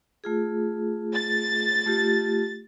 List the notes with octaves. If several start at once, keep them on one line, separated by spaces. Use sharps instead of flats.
A3 F4 G#4
A6
A3 F4 G4